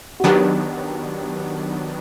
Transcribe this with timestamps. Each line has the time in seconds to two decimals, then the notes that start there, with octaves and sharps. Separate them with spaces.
0.20 F#4
0.24 D#3 F#3 B3 D4 G4